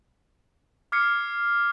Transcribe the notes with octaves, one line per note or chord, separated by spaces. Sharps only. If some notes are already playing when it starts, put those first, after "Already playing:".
D6 F6 G#6 C7 C#7